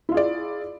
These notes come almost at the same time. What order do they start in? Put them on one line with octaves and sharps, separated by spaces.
E4 F4 G#4 D5